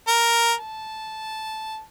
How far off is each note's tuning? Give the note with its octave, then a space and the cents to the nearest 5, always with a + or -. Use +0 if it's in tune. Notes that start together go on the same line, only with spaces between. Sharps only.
A#4 +0
A5 -10